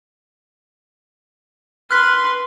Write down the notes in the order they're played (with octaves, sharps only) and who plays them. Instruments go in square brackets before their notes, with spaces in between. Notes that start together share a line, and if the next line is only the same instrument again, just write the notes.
[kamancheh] B4 C6 [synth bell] F6 F#6 B6